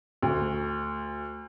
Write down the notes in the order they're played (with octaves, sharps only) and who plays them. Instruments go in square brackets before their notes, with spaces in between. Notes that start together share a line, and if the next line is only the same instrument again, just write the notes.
[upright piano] D2